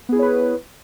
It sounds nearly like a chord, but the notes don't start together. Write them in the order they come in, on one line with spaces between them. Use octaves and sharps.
B3 G#4 E4 C#5 B4